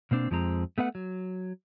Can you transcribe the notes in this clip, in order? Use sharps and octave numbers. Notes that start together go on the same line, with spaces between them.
B2 A#3 C4 D4
F2 F3 G#3 C4 A#5
A3 B3 B4 F#5
F#3